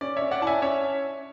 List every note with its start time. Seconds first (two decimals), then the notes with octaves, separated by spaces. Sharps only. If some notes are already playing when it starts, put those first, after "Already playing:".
0.01 C#4 D5
0.16 C#5 E5
0.22 C#4
0.31 D5 F#5
0.42 E4 A5
0.47 E5 G#5
0.62 C#4 C#5 E5